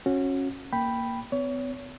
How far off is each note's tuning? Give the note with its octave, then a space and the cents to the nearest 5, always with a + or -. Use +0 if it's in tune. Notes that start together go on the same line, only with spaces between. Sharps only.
C#4 -20 F#4 -20
A#3 +0 G5 +0 B5 +0
B3 +45 C#5 +30